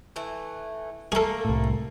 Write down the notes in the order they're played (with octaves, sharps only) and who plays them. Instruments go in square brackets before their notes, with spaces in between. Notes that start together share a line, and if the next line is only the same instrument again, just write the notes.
[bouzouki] E3 A3
[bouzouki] A3 A#3 [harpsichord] G#4 A4
[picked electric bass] C2 A2